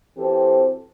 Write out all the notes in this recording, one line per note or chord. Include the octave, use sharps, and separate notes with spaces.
E3 C4 F#4 G4 A4 C5